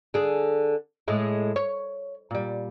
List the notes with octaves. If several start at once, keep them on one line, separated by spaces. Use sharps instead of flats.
D3 G#4
A2 G#3
C#5
A#2 G3